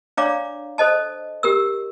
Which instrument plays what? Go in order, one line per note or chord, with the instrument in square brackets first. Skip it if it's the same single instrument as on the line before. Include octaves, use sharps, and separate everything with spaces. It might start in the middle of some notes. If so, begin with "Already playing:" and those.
[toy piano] D4 C#5 D5 F5 A#5 D6
A4 C5 D#5 A5
G4 A#4 E6